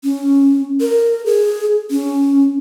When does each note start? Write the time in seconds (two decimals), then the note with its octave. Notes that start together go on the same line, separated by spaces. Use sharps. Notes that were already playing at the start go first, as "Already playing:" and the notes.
0.04 C#4
0.81 A#4
1.26 G#4
1.91 C#4